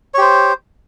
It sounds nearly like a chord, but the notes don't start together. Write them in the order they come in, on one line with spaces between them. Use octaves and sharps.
C#5 G4 C5